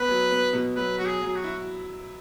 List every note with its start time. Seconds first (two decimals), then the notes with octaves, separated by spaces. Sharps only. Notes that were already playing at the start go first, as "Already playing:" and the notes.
Already playing: B3 B4
0.08 F#3
0.30 B3
0.53 B2
0.76 F#3 B4
0.98 F#3 F#4
1.06 G#4
1.21 F#3
1.27 G#4
1.36 F#4
1.44 E4